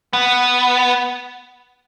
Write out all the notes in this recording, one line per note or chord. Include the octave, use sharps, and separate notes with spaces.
B3